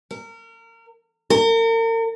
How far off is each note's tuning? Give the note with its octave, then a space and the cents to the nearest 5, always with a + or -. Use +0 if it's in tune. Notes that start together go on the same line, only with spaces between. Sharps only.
A#4 -30
A#4 -40